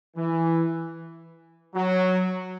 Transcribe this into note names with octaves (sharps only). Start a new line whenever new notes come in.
E3
F#3